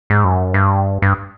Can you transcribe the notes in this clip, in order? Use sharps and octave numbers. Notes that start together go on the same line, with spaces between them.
G#2
F#2
G2
G2